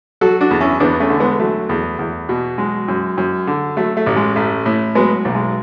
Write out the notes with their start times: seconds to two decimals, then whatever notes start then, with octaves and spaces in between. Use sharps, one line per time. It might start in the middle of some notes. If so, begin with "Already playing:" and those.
0.21 F#3 F#4 A4
0.41 D4 F#4
0.51 E2
0.60 C#4 E4
0.80 E2 B3 D4
1.00 A3 C#4
1.10 D3
1.20 G#3 B3
1.40 F#3 A3
1.69 E2
1.99 E2
2.29 B2
2.58 F#3 G#3
2.88 F#2
3.18 F#2
3.47 D3
3.77 F#3 A3
3.97 A3
4.06 A1
4.16 G#3
4.36 A1 A3
4.66 A2
4.95 F#3 G#3 B3
5.25 B1
5.35 G#3